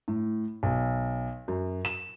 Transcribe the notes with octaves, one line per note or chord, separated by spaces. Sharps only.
A2
B1
F#2
E7